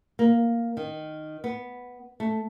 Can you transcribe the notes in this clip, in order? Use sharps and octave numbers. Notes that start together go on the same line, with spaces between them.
A#3
D#3
B3
A3